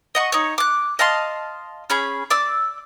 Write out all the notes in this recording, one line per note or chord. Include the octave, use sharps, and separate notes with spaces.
D#5 F#5 C#6
D#4 C#5
D6 F#6
D#5 F5 A5 C6
C#4 G#4 B5
D5 D6 E6